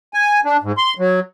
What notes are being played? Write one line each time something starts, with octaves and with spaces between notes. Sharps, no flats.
G#5
D4
G#2
C6
F#3